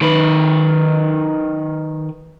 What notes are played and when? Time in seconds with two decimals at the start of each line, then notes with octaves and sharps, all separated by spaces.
0.01 D#3 B4